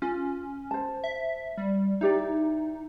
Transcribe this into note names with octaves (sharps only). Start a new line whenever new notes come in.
C#4 F4
C5 A5
E5
G3
D#4 E4 G4 D5